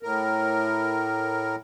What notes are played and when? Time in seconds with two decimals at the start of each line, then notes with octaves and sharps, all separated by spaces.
0.03 A2 A#4